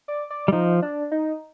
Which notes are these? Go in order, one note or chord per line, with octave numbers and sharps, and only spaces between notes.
D5
D5
G3
F3 D#4
D4
D#4